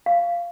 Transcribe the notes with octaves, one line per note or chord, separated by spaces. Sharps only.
F5